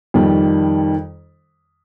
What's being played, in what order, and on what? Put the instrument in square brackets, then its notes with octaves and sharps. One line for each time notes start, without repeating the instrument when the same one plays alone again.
[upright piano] F2 D#3 G3